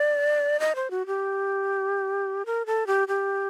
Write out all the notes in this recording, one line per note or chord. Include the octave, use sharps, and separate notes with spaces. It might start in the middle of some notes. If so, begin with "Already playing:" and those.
Already playing: D5
D#5
C5
F#4
G4
A#4
A4
G4
G4